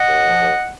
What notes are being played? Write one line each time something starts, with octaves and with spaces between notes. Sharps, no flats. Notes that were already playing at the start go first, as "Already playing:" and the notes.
Already playing: D#5 F#5
D#2
F3
D#2